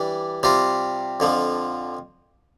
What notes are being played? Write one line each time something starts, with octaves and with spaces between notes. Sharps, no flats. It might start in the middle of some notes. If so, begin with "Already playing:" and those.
Already playing: E3 G3 D4
C3 G3 C4 F4
F2 D3 F3